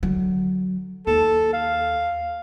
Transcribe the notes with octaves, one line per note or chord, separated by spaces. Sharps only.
D3 F#3
D#2 A4
F5